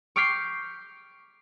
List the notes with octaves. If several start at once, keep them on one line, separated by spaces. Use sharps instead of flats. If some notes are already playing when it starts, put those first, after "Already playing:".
C#6 D6 F6 G6 B6 C7